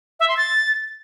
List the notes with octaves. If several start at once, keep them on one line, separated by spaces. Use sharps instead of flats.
E5
C6
A6